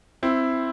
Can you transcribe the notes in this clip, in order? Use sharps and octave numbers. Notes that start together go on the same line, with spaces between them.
C4 E4